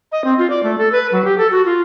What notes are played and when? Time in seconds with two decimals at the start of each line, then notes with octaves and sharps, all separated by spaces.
0.12 D#5
0.24 C4
0.39 F4
0.50 D5
0.63 A3
0.78 A4
0.92 B4
1.12 F#3
1.24 G4
1.38 A4
1.51 F#4
1.66 F4